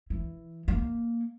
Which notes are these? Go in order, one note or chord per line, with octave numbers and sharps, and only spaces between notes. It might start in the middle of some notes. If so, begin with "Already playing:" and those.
E3
A#3